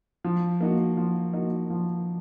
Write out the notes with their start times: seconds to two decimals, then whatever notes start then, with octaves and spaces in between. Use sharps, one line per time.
0.24 F3
0.60 A#3 D#4 F#4
0.97 F3
1.33 A#3 D#4 F#4
1.70 F3